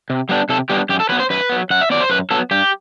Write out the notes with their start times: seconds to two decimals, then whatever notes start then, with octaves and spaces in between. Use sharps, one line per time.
0.10 C3
0.29 G3 B3 D4
0.49 C3 A4
0.70 G3 B3 D4 G4
0.89 F#2 G4
1.00 A4
1.09 F#3 B4
1.12 B3
1.20 C5
1.30 F#2 B4
1.50 F#3 B3
1.70 F#2 F#5
1.81 E5
1.90 F#3 B3 D5
2.01 C5
2.10 F#2 B4
2.31 F#3 B3 A4
2.51 G2 G4